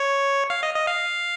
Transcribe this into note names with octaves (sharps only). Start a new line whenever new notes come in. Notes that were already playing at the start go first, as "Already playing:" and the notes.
Already playing: C#5
F5
D#5
D#5
F5